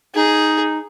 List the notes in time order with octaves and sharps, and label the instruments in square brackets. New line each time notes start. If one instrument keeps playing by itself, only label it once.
[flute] D#4 [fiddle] G#4